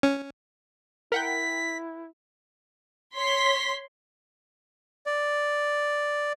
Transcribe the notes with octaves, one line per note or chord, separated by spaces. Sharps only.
C#4
E4 A#4 F#5 G5 B6
C#5 C6 B6
D5